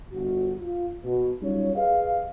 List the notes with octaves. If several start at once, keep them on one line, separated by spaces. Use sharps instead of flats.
G1 F#4
F4
B2
F#3 G3 C#4 D#4 F4 C#5
G4 G#4 B4 D#5 F5